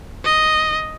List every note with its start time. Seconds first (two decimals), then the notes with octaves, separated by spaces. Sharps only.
0.25 D#5